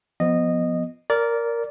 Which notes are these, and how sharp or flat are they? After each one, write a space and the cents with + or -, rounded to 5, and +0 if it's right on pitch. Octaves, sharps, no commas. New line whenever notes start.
F3 +0 B3 +0 D#5 -15
A#4 +0 D5 -20